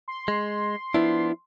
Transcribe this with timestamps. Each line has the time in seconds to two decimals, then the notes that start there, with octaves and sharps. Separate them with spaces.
0.08 C6
0.28 G#3
0.94 F3 B3 D4 E4